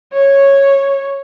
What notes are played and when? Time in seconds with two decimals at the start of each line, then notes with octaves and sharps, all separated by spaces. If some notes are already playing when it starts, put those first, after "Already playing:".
0.13 C#5